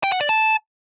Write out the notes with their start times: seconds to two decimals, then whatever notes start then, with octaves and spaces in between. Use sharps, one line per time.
0.04 G5
0.12 F#5
0.21 D5
0.29 A5